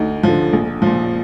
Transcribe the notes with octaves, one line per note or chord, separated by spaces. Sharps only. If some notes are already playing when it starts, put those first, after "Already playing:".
Already playing: D2 D#4
D3 F3
A#1
A#2 F3